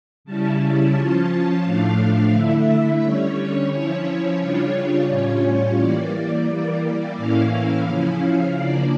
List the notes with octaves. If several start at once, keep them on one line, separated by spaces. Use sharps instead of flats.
C#3 G3 C#4 E4 A5
A5
F3 C#4 F4
A2 F3 A3 D4 F5
D3 A3 E4 E5
D3 G3 C#4 C#5
F3 C#4 E4 C#5
C#3 G3 D4 F4
A2 G3 C#4 F4
E3 G3 A#3 D5
E3 G3 A#3
A2 E3 A#3 C#4 E4 F5
C#3 F3 C#4 E4
C#3 F3 A#3 D4 D5